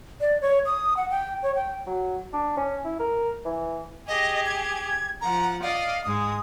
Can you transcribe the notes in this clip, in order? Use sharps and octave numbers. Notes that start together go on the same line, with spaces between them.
D5
C#5
D#6
F#5
G5
C#5
G5
F#3
D4
C#4
E4
A#4
E3
G4 G#4 D#5
G#6
F3 F#5 A#5
D5 D#5 F5
G#2 G#3 D#6